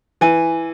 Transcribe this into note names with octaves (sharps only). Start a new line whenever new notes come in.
E3 G#5